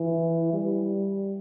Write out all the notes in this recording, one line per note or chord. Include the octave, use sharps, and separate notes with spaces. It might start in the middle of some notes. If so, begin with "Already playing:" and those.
Already playing: E3
G3